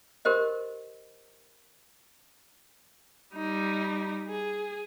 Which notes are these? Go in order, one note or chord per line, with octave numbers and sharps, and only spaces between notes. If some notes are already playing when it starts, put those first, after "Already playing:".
F#4 G4 A#4 C5 D#5
G3 D#4
G#4